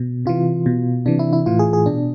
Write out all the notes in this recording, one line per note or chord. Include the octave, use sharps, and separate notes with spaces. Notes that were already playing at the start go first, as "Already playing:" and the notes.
Already playing: B2
C3 E3 F4
B2
C3 E3 D4
E4
E4
A2 E3 F4
G#4
G#4
B2 D4